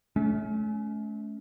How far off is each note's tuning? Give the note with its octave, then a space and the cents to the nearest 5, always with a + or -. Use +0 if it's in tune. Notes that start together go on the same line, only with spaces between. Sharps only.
A3 -35 C#4 +25